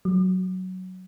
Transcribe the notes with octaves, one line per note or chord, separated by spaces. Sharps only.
F#3